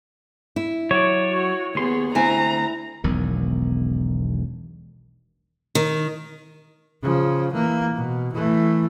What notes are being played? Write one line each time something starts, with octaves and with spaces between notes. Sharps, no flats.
E4
F#3 C#5 D5
F#4
D#2 B3 G#4 C6
D2 C4 E4 G#5 A#5
E1 B1 D#3
D#3
C#3 F3
E3 A#3
B2
E3 A3